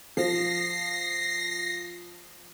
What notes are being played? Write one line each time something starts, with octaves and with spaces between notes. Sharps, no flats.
F3 A#6 C7